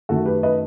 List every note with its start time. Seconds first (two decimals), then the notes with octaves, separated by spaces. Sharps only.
0.09 F#2 D#3 A3 F#4 A4
0.26 G4 B4
0.43 B4 D#5